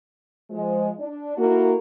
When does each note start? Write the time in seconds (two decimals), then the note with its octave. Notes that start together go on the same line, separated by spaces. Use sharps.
0.50 F3 G#3
0.99 D4
1.38 A#3 E4 F#4 A4 A#4